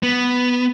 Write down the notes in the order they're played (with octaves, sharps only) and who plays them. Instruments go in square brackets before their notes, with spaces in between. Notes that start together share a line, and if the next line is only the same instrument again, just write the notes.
[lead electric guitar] B3